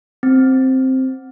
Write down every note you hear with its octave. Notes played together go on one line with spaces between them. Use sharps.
C4